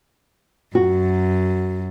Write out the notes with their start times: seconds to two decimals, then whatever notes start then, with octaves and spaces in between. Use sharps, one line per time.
0.75 F#2 F#4